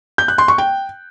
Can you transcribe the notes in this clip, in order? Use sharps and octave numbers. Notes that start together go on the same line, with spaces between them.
G6
F#6
C6
C#6
G5